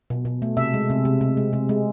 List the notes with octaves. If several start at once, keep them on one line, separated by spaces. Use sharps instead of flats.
B2
B2
A3
C3 E5
G#3
C3
C3
C3
G#3
C3
G#3